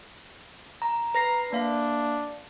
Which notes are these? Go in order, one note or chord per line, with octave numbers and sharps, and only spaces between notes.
A#5
B4 A#5 A#6 C7
A#3 D4 F5